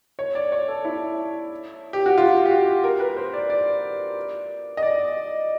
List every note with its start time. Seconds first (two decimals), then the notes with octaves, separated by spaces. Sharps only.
0.19 C#5
0.35 D5
0.52 C#5
0.68 A4
0.85 E4
1.93 G4
2.06 F#4
2.18 F4
2.46 G4
2.51 F#4
2.84 A#4
3.00 B4
3.17 C5
3.33 D5
3.50 D5
4.77 D#5
4.83 D5